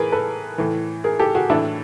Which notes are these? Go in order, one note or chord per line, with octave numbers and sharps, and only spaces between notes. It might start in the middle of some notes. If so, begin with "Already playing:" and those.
Already playing: A2 E3 G#4 A#4 B4
A4 B4
A2 E3
G#4 A#4
G4 A4
F#4 G#4
A2 E3 D4 E4